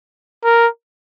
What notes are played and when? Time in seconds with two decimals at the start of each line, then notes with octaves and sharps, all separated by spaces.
0.44 A#4